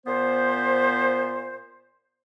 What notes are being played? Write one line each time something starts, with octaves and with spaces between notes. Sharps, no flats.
A#2 B3 C5